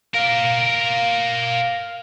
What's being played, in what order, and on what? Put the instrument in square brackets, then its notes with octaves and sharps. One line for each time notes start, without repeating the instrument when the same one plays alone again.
[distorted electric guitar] A#4 D5 [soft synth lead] F5